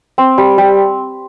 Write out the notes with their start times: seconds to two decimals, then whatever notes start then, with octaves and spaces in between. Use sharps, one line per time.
0.18 C4
0.38 G3
0.58 G3